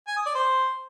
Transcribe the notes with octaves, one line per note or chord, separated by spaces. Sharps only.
G#5
D#6
D5
C5